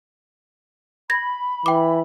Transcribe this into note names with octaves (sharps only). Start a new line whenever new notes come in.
B5 G#6 A#6
E3 G5 D6